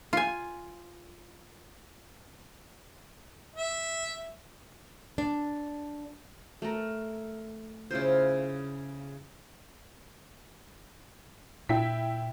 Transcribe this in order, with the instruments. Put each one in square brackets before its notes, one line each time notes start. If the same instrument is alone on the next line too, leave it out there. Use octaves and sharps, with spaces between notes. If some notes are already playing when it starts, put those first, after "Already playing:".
[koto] F4 G#5
[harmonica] E5
[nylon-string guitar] D4
[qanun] A3 A#4
C#3 E4 F4 C5
[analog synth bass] A#2 [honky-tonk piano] E4 G5 B6